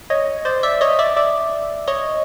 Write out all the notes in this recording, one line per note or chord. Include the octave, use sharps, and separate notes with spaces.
C#5 D#5
C5 D5
D5 E5
C#5 D#5
D5 E5
D5 E5
C#5 D#5